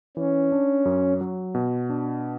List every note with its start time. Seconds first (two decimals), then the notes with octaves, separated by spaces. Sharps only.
0.17 E3 C#4
0.52 D4
0.85 F#2
1.21 F#3
1.55 B2
1.90 D4